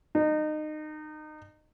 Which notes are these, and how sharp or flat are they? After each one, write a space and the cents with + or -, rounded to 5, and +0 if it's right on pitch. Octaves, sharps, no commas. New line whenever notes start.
D#4 -25